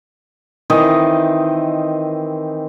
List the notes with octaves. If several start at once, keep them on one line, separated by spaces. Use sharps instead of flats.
D#3 E3 C4 D#5